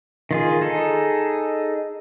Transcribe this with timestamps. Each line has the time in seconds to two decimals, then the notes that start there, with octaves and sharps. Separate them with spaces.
0.31 D#3 F4 G#4
0.61 D#4 G#4 A4